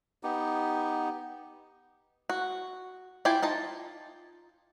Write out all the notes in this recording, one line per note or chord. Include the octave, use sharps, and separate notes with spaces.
B3 D#4 G4
F#4
E4 F4 G4 G5 G#5
D#4 F4 A5